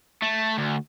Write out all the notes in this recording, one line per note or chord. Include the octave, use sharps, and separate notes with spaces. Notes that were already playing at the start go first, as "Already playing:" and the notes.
A3
D2